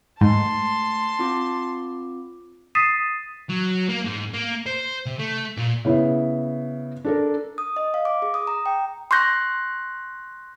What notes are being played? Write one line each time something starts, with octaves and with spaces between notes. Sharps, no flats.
G#2 A3 A5 C6
C4 F4 D6
D#6 A6 B6 C7 D#7 E7
F#3
A#3
G#2
A#3
C5
C3
A3
A#2
C#3 B3 E4
D4 A4 A#4
D#6
D#5
F5
D6
G#4
D#6
A#5
G5
C6 C#6 F#6 G6 A#6